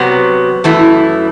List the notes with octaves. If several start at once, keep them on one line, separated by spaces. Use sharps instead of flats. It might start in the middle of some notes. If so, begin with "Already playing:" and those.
Already playing: C3 F#3 B3
F#2 E3 A3 E4